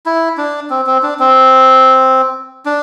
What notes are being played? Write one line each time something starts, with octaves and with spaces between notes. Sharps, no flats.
E4
D4
C4
C4
D4
C4
D4